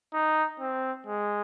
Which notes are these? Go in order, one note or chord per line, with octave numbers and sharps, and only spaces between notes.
D#4
C4
G#3